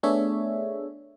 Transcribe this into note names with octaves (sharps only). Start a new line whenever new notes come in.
A3 B3 D4 G#4 C#5 E5